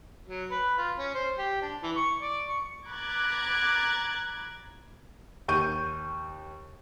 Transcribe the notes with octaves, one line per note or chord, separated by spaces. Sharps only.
F#3
B4
F4
C#4
C5
G4
D4
E3
C#6
D5
C#6
A#5 B5 D6 F#6 G#6 A6
D#2 C#6 G6 D#7